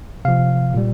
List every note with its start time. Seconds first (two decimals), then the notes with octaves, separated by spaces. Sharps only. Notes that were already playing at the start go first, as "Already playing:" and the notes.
0.25 C3 F3 F5
0.74 A#2 G3